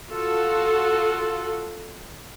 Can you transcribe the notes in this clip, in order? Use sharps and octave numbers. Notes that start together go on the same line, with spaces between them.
F4 F#4 A4